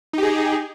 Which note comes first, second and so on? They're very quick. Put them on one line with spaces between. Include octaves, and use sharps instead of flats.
D#4 G4 G#4